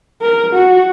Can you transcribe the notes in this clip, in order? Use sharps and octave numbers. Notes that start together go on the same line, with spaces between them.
A#4
F#4